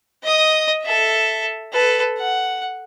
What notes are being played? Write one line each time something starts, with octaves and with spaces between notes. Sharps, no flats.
D#5 D#6
A4 E5
A4 B4
F#5